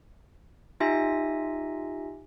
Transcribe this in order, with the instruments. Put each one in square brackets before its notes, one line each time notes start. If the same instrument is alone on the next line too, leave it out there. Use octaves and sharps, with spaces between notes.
[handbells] D#4 F4 G4 E5 G#5 A#6